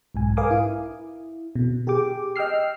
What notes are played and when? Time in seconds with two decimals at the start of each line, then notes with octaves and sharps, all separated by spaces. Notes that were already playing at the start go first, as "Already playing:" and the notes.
0.14 B1 G#2 G#5
0.37 A#4 B4 F5 G#5 D6 D#6
0.51 E4
1.55 B2
1.87 G4 G#4 G5 D6
2.36 D#5 G5 E6 F6 C7